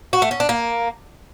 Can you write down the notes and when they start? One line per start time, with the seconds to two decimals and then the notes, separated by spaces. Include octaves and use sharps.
0.13 F#4
0.22 A3
0.31 C#4
0.40 D4
0.49 A#3